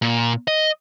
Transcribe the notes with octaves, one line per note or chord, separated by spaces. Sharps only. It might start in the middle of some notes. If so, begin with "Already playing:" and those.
A#2
D#5